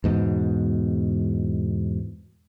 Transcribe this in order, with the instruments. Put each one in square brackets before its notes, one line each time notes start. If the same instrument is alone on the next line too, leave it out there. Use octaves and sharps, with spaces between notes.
[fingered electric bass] E2 G#2 B2